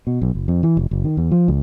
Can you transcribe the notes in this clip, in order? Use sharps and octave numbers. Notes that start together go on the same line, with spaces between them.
B2
B1
F#1
F2
E3
F1
F#1
D#3
E2
F3
C#2